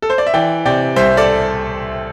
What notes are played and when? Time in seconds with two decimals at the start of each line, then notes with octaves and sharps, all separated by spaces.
0.02 A4
0.10 C5
0.18 D5
0.27 E5
0.34 E3 D5 G5
0.65 C3 D5 G5
0.96 C2 C5 E5
1.17 A4 D5